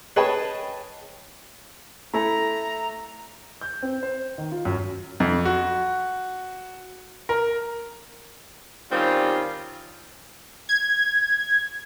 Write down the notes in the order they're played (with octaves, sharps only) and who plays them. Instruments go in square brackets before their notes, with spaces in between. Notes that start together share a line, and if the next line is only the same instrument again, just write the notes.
[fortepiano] G#4 B4 C#5 D#5 G5 A5
[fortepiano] A3 E4 A4 [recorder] A#5
[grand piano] G6
C4
C5
D#3
F4
F#2
F2
F#4
A#4
[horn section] D#3 G3 C4 C#4 F4
[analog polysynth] G#6